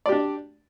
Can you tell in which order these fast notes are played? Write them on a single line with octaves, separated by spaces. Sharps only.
D5 G4 D4